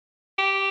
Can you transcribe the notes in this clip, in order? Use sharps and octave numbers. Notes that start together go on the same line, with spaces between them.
G4